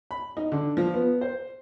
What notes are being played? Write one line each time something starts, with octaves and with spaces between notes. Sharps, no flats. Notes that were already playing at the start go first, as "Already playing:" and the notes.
B5
D#4
D3
F3
B3
C5